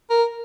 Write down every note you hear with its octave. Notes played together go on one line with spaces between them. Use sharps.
A#4